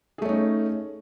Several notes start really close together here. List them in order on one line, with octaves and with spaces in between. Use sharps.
G#4 A3 C#4 D#4